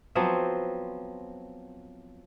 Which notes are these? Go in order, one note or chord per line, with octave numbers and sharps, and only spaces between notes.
F3 F#3 B3 C4